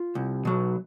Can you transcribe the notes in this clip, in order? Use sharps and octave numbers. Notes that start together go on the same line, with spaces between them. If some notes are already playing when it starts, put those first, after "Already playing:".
Already playing: F4
C2
B2 F#3